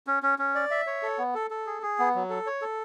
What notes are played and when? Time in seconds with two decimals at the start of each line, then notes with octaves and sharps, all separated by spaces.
0.07 C#4
0.23 C#4
0.39 C#4
0.55 D5
0.71 E5
0.87 C#5
1.03 A4
1.18 B3
1.35 A4
1.51 A4
1.67 G#4
1.82 G#4
1.99 B3
2.15 F#3
2.30 A4
2.46 C#5
2.62 A4